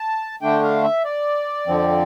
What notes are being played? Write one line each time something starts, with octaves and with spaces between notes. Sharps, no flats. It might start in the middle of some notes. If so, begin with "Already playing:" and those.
Already playing: A5
D3 A3 D4 G5
F5
E5
D5
F2 D3 F3 C4